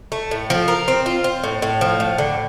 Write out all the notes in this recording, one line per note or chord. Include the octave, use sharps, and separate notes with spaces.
A3
A2
F3
A#4
C4
F4
C4
A2
A2
F3
A2
D3